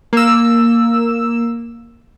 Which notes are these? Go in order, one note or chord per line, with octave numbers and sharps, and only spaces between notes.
A#3 E6